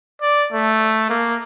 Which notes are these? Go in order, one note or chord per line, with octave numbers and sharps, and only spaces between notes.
D5
A3
A#3